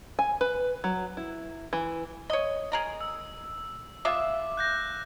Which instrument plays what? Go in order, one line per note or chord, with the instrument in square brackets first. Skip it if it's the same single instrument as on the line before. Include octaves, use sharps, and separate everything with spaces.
[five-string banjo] G#5
B4
F#3
E4
E3
[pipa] C#5 D#5
G#4 A#4 D#5
[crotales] E6
[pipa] G#3 F4 E5 [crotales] D6
[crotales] F#6 G6 A#6